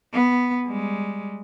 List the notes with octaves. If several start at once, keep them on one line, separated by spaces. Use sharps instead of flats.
B3
G3 G#3